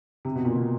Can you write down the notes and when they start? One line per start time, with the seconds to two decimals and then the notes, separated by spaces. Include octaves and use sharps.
0.25 C3
0.35 B2
0.45 A#2
0.55 B2